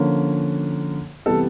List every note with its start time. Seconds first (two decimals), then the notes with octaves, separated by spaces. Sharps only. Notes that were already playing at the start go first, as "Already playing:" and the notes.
Already playing: D3 F3 A#3 C#4
1.26 C3 E3 G3 B3 A4